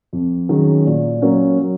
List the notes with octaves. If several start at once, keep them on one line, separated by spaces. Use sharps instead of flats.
F2
D#3 F#3 C#4 G#4
A#2
F#3 A#3 C#4
F#3